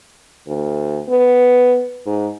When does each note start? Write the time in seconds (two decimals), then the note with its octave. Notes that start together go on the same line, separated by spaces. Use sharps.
0.48 D2
1.09 B3
2.06 G#2